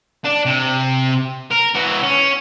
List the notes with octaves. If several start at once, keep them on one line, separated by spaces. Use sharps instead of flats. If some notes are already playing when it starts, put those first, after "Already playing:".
D4
C3
A#4
E3 F#4
C#4